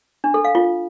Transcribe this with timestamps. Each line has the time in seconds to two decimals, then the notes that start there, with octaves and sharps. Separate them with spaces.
0.24 D4
0.34 A4
0.45 F5
0.55 F4